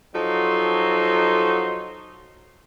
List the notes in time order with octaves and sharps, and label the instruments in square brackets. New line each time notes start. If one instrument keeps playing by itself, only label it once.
[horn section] F3 F#3 D#4 A4 C6